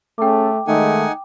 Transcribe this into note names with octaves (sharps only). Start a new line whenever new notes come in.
A3 C#4 G#4 A4 G5 D6
D#3 G#3 A3 D#4 F#5 G#5